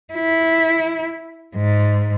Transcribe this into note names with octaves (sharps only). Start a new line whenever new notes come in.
E4
G#2